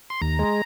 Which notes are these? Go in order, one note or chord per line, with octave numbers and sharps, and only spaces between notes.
C6
D#2 A#5
G#3